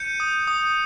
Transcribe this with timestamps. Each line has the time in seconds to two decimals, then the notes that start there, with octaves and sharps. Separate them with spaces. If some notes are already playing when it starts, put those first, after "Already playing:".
Already playing: G6 C#7 D#7
0.20 D#6
0.47 D#6